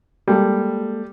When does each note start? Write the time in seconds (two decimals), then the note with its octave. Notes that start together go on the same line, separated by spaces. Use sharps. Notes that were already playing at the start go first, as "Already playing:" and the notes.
0.28 G3 G#3 A#3 A4